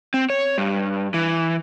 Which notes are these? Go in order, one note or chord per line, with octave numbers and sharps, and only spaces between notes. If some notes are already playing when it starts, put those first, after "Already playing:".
C4
C#5
G2
E3